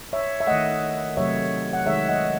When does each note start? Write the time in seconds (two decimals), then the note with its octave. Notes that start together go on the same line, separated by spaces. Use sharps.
0.13 C#5 E5
0.40 E5
0.47 D#3 A3 D#5 F#5
1.17 C3 F#3 A3 C#5 E5
1.73 F#5
1.86 D#3 G#3 C#5 E5
2.09 D#5 F#5